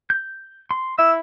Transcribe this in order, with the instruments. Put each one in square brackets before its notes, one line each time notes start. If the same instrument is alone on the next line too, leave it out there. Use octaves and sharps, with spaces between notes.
[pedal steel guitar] G6
C6
[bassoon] E4 [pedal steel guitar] E5 [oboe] E6